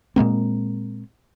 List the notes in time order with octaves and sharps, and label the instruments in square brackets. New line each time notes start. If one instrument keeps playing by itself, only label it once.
[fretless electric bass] A#2 G#3 A#3 C4